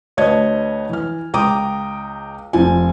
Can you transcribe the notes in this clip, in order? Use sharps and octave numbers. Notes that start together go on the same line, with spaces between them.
D2 B4 C#5 D#5 A5 G#6
E3 F6
C#2 G5 A#5 D6 D#6
F1 F3 G#5